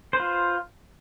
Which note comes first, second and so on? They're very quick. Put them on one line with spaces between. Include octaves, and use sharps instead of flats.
C5 B4 F4